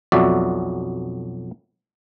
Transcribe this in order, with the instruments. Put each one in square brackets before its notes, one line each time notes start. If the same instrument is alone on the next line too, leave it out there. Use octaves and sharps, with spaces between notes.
[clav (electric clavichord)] B1 F2 F#3 F#4 D5 E5